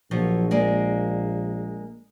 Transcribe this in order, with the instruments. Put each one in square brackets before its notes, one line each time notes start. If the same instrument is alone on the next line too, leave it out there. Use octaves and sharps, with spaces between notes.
[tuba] A#1 [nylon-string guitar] F3 F#3 C#5
[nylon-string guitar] G#3 A#3 D5